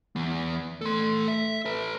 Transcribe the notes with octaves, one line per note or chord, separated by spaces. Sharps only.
E3 B3
A3 A4 C6
E5
A4 B4